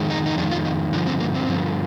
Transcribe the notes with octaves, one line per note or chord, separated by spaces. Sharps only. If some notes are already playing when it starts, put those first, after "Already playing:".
Already playing: F2 D#3 G#3
D#4
D#4
F2 D#3 G#3 D4
F4
D#4
G2 D3 F3 D4
C4
A#3
C4
G2 D3 F3